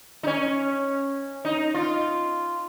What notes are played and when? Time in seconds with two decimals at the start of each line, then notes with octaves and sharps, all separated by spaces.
0.23 D#4
0.27 C#4
1.45 D#4
1.74 F4